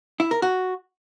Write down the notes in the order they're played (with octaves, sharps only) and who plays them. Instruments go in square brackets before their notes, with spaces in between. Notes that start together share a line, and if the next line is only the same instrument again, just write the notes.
[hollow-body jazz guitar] E4
A#4
F#4